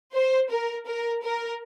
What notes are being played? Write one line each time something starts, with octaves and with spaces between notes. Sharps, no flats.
C5
A#4
A#4
A#4